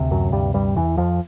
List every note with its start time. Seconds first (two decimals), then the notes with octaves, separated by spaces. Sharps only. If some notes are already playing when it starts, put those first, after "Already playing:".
Already playing: D2 C3
0.11 F#2 F#3
0.32 G2 G3
0.54 G2 G3
0.76 E2 E3
0.97 F2 F3